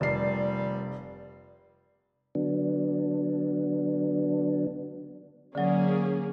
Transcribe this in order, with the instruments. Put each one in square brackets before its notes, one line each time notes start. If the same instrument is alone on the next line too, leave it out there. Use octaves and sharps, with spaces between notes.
[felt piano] F1 C7 [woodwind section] A#2 G3 [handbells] D5
[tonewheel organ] D3 F#3 B3 D4
[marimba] D3 F#3 [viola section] A#3 C#4 G#4